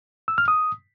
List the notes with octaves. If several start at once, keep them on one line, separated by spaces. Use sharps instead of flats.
E6
F6
D#6